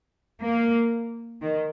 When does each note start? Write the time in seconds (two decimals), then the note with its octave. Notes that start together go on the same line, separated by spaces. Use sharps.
0.41 A#3
1.42 D#3